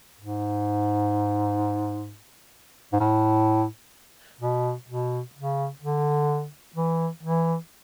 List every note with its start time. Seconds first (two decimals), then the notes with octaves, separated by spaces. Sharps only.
0.19 G#2
2.93 G#2
3.00 A2
4.41 B2
4.88 B2
5.35 C#3
5.81 D3
6.76 E3
7.23 E3